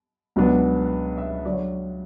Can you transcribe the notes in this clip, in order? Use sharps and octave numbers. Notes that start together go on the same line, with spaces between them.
C#2 B2 F#3 B3 D4
E5
D3 F#3 D5
C#5